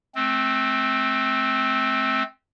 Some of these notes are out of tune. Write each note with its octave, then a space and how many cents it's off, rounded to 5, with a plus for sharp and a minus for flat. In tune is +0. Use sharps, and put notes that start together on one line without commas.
A3 -35 C4 +5